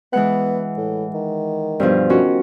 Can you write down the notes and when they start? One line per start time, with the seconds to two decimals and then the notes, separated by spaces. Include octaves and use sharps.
0.13 E3 G#3 B3 F#5
0.77 A2
1.15 D#3
1.80 G2 B2 F3
2.10 D#3 C#4 F4 F#4